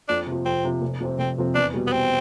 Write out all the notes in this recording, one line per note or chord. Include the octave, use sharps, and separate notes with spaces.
F2 D4
C3
F3
F2 C4
C3 F3
F1
F2 C3 F3 C4
F1 C4
F2 C3 F3 C4
E2 D4
B2 G3
B3
E2 C4